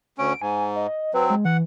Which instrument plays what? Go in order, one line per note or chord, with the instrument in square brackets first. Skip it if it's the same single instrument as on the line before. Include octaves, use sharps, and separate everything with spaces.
[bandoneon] D2 C#4 [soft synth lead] D7
[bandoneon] G#2 [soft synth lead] G#5
[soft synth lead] D#5
[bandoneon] F#3 C4 [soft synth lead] B4
[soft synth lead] G#3
[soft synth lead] E3 [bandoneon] F#5